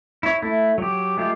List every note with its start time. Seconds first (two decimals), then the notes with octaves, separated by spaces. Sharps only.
0.23 E4 C#5
0.42 A3 E4
0.78 F#3 G4
1.17 G#3 A3 F4 G4